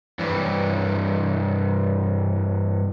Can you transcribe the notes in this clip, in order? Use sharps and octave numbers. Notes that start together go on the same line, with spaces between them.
G2 E3